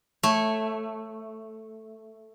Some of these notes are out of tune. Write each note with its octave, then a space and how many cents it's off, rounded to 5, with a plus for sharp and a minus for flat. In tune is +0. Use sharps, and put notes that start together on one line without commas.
A3 +0 C#5 -15